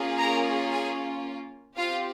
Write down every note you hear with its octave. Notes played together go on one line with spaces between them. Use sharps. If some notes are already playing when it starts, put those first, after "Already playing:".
Already playing: A#3 C#4 F4 G#4
A#4 A#5
G#4 G#5
C4 F4 G4 F5